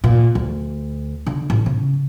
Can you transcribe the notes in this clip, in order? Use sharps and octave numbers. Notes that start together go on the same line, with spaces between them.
A#2
D2
D3
A1
C#3